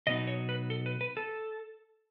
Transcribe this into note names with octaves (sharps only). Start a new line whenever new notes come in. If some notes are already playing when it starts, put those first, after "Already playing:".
B2 F#3 B3 D#4 D#5
C#5
B4
A4
B4
B4
A4